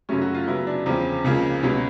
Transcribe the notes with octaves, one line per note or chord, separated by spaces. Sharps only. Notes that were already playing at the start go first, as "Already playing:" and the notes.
F#2 C#3 F#3 A3 C#4
F#4
F4
F#2 C#3 F#3 B3 E4
D4
E2 C#3 F3 C4
C#2 C#3 F3 A#3
C#2 B2 F#3 B3 C#4